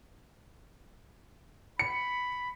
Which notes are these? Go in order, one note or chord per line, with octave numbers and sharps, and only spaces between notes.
B5 C#7